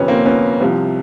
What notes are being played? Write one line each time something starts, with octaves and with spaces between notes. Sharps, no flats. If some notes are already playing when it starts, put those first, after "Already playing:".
Already playing: G1 F2 C3 B3 C#4
A#3 C4
B3 C#4
C2 C3 F3